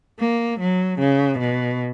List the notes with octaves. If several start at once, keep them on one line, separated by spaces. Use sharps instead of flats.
A#3
F#3
C#3
B2